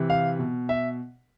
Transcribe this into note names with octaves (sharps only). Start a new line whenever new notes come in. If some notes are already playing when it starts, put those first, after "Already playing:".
Already playing: C3 E3
F5
B2
E5